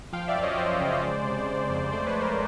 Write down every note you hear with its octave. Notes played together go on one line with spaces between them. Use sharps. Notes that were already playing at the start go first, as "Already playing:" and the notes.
F3 F5 G5
D5 E5
F#2
C#5 D#5
F3 C5 D5
C#3
G#3
C3
G#3
F2
A3 C5 D5
B4 C#5
A3
A#4 C5